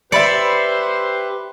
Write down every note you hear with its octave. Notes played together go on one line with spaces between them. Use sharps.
G4 B4 C5 D5 E5 B5 C#7